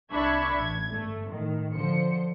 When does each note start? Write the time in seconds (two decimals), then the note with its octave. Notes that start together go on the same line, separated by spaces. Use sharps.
0.11 C2 D4 E5 B5 C#6 G#6
0.55 A1 G#6
0.92 G1 A3
1.27 A2 D#3
1.74 D3 F3 C5 C#7